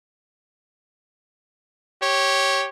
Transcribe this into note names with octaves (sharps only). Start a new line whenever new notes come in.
G4 C#5